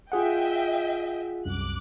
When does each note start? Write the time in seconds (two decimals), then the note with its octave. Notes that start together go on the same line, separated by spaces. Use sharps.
0.12 F4 G#4 D#5 E5 F#5 G5
1.45 C2 F#2 D6 F#6